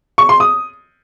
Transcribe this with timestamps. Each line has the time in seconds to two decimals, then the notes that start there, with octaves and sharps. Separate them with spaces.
0.18 C#6
0.29 C6
0.40 D#6